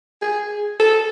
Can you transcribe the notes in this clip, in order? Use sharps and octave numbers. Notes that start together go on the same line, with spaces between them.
G#4
A4